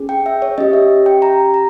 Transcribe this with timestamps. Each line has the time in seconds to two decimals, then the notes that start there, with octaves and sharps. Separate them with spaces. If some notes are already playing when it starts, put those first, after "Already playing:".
Already playing: C#4 G#4
0.09 G5
0.26 E5
0.42 C#5
0.58 C#4 G4 D#5
0.73 E5
1.06 G5
1.22 A#5
1.54 A#5